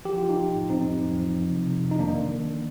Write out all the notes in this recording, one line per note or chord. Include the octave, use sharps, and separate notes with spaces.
F3 G4
F3 F4
D#4 G4
F3
A2
F3 C4 D#4
F2
F3
F3
F3
C3
C3
F2
D#4
D#3 A#3 D4
D#3
D#3